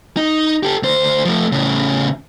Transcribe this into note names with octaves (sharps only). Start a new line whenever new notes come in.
D#4
G4 A4
D2 C5
F3 A3
A2 C#3